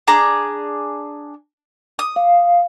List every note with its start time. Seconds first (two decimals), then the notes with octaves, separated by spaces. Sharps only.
0.08 D4 G#4 A#5
1.99 D#6
2.16 F5